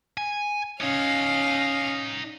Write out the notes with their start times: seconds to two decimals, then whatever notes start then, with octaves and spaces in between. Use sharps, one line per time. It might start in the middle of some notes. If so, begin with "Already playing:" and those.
0.17 G#5
0.81 C#4 D#4 C#5 F5